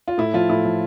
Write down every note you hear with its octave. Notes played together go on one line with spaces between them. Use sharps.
F4
A2 E4
F3 F4
A2 E4
F3